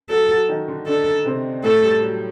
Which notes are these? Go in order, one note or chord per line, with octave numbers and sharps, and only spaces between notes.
F#3 F#4 A4
F#3 F#4
D#3 D#4
D3 D4
D3 D4 A4
C3 C4
A2 A3 A4
G3
F#3